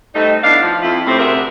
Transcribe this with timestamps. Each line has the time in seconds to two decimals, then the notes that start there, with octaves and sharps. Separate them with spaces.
0.15 G3 A3 C4 D#4
0.43 B3 D4 E4 F5
0.62 F3
0.82 F2 E4 F4
1.06 A2 C3 C4
1.19 D2 C3 F#4 G#4 A#4 E5